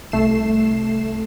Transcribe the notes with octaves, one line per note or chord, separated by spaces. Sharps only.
C2 A3 C7 E7